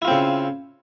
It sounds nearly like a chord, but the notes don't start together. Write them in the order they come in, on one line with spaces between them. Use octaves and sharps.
E4 F4 C4 C#3